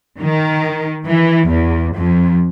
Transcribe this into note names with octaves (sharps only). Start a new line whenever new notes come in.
D#3
E3
E2
F2